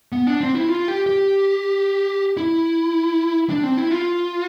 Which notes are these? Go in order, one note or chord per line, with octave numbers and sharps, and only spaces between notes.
B3
D4
C4
E4
F4
G4
G4
E4
D4
C4
E4
F4